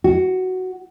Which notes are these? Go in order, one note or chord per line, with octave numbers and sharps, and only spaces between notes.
F#4